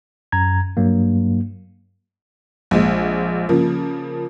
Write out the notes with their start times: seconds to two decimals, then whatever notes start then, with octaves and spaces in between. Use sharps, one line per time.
0.32 F#2 A#5 G#6
0.77 G2 F#3 A#3
2.71 A#1 G#3
3.49 C#3 F3 A#3